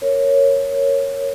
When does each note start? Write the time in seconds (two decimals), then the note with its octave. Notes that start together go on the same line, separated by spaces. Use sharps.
0.02 A#4 C#5